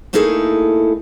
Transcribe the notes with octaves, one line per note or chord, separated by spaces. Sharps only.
A3 A#3 D#4 E4 G#4 A4